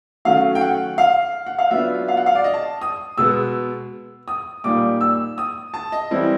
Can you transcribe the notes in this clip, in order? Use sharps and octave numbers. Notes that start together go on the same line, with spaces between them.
D#3 F#3 A3 C#4 F5
G5
F#5
F5
F#5
F5
F#3 B3 D4 F4 E5
F5
F#5
F5
D5
D#5
A5
D#6
B2 G#3 B3 E6
D#6
A#2 G3 A#3 D#4 D6
E6
D#6
A5
D#5
E3 G3 C4 E4